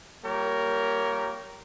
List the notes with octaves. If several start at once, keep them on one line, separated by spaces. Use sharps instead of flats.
G3 A#3 F4 G4 A#4 C#5